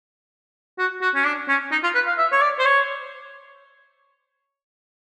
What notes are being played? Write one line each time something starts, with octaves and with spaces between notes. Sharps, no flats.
F#4
F#4
C#4
D4
C#4
D#4
F4
B4
F5
E5
C#5
D5
C5
C#5